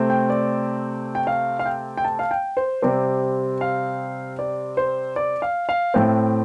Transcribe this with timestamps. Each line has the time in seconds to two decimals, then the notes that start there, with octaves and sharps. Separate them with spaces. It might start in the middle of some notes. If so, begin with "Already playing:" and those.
Already playing: C3 A3 C4
0.10 G5
0.30 D5
1.15 G5
1.27 F5
1.59 F5
1.66 G5
1.97 G5
2.04 A5
2.19 F5
2.31 G5
2.57 C5
2.82 C3 G3 C4 D5
3.61 F5
4.39 D5
4.77 C5
5.16 D5
5.42 F5
5.69 F5
5.94 A2 A3 C4 G5